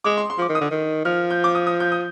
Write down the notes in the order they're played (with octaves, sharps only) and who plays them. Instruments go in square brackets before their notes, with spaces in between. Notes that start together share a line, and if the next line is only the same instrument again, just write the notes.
[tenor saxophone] G#3 [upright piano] D6
[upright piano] C6
C6
[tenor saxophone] F3 [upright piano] D6
[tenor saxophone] D#3
[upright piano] D#6
[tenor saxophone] D3
D#3
[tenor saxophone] F3 [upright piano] F6
[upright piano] G6
D6
D#6
D#6
G6
D#6